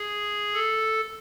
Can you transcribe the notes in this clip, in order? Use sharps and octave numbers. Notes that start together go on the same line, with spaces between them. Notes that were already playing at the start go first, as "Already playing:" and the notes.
Already playing: G#4
A4